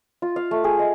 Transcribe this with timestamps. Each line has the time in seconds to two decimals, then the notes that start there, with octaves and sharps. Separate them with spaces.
0.22 F4
0.36 F5
0.51 A3
0.64 G#4
0.79 D#5